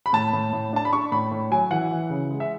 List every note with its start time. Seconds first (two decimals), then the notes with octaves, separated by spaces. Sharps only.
0.06 B5
0.13 A2 A5
0.33 A2
0.53 A2
0.73 D4 A5
0.85 B5
0.93 D4 C#6
1.12 A2 B5
1.31 A2
1.51 F#3 G#5
1.70 E3 F#5
1.91 E3
2.10 C#3
2.30 G#3
2.40 E5